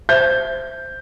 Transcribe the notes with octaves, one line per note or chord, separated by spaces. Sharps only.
C5 E5 G6